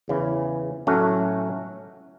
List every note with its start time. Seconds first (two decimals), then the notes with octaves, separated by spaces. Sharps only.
0.08 E2 C#3 E3
0.87 A2 F#3 A3 C#4 F#4